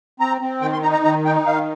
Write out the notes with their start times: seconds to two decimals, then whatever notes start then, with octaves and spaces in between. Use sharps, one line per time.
0.20 C4 A#5
0.41 C4
0.62 D#3 G5
0.73 C6
0.82 D#4 A#5
0.93 A#5
1.04 D#3 A#5
1.25 D#4 G5
1.46 D#3 F5